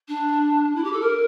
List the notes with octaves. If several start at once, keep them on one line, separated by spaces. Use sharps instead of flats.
D4
E4
G4
A4
A#4